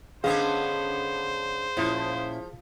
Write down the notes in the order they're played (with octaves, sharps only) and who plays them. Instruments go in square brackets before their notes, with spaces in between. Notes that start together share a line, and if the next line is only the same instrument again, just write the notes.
[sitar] D3 B3 C#4 [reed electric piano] G#4 F5 [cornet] C5 [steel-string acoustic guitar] D#5
[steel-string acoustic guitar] A#2 C#4 E4 [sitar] F3